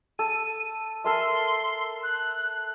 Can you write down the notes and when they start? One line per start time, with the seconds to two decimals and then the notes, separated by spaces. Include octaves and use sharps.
0.19 A4 D#7
1.04 A4 A#4 E5 C6
2.03 F#6